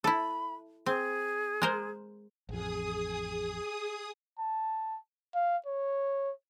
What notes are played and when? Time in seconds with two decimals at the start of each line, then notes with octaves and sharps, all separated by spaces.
0.04 E4 A4 B5
0.86 C4 G#4
1.62 G#3 A#4 C5
2.49 A1 F2 G#4 D#6
4.39 A5
5.35 F5
5.66 C#5